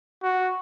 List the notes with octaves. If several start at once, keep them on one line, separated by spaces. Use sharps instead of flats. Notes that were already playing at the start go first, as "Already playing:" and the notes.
F#4